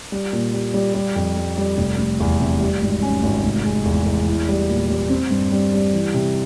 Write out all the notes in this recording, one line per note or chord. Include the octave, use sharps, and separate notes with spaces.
G3
A#2
G3
G3
G3
F2
G3
G3
F1
F1
E2
C3
G3
G#1
C#4
G#1
F1
G#3
E2
E2
E4
G3
A#2
G3
C4
G2
G3
G3
E3
C3